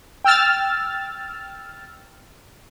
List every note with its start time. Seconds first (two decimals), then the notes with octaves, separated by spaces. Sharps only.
0.24 G5 E6 F6 A6